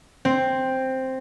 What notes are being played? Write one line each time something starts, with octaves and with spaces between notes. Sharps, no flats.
C4